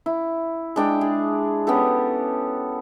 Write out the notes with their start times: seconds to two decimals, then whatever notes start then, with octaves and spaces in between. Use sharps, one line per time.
0.06 E4
0.76 G#3 D4 G5
1.01 G#4
1.67 B3 C#4 G4 A4